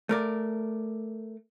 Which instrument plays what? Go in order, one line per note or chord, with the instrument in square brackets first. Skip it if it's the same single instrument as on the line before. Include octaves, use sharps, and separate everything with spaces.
[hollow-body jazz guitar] A3 A#4 D5